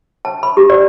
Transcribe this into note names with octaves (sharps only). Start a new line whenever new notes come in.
A5
B5
G4
D5